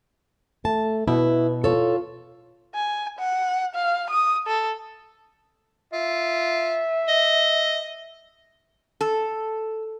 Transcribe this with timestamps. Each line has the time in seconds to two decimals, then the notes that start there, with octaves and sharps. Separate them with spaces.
0.65 A3 A5
1.08 B2 E4 B4
1.64 F4 A4 C#5
2.75 G#5
3.19 F#5
3.75 F5
4.10 D#6
4.47 A4
5.93 F4 E5
7.08 D#5
9.01 A4